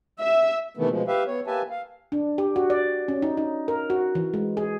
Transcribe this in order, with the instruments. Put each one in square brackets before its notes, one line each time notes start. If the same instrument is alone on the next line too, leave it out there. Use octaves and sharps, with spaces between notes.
[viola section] E5
[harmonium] C3 D#3 E3 A3 B3
B2 F3 G#3
G4 B4 E5 F5
B3 C#5
A#3 G4 B4 E5 G#5 A5
F5
[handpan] D4
G4
F#4
D5
C#4
D#4
D#4
A#4
F#4
E3
G#3
G#4